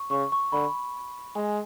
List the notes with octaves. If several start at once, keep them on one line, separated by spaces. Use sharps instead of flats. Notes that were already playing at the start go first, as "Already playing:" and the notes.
Already playing: C#6
C#3 C#6
C#6
D3 B5
G#3 G#5